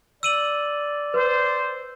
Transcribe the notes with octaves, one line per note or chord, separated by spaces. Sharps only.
D5 E6 D#7 F#7
B4 C5